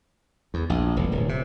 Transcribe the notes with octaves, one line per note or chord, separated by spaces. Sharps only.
E2
A#1
E1
D1
C3